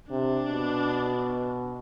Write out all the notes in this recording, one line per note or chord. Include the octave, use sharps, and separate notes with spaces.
C3 D4
B2